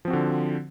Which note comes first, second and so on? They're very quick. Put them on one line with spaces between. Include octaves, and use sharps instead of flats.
F3 C4 F#4 D3